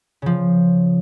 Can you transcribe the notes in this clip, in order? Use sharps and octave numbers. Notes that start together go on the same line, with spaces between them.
C#3 F3